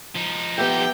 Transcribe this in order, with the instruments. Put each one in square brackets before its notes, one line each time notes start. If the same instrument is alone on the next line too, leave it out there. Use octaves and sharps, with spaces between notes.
[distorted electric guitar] F3 D#4
[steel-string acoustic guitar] B3 E5 [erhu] G4 [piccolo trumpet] G5